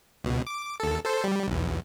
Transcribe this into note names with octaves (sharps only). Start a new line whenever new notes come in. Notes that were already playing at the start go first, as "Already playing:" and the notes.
C#2 B2
D6
D#2 A4
A4 C5
G3
B1 E2